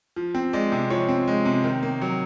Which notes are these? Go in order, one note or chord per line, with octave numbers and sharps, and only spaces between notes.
F3
C4
G#3 D5
C3
F3 C#5
C4
G#3
C3
D#3
A#3
F#3